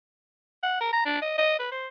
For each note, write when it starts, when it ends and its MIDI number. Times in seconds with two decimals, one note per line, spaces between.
0.63 0.77 78
0.81 0.88 70
0.93 1.04 82
1.05 1.17 62
1.22 1.36 75
1.38 1.58 75
1.59 1.71 71
1.72 1.88 72